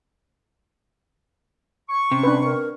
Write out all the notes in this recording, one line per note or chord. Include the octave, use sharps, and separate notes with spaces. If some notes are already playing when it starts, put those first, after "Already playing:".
C#6
C3 C#4
D4 B4
A#4